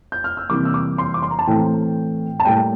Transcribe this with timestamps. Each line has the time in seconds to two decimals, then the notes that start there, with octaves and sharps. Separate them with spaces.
0.12 G6
0.24 F6
0.37 E6
0.49 C3 E3 G3 A#3 D6
0.65 E6
0.74 D6
0.98 C6
1.14 D6
1.22 C6
1.31 A#5
1.39 A5
1.47 A2 E3 A3 C4 G5
2.40 A5
2.45 A2 G3 A#3 G5